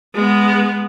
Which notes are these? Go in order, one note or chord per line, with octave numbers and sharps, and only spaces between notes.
G#3 B3